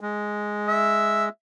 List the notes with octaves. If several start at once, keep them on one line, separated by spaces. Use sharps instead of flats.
G#3
E5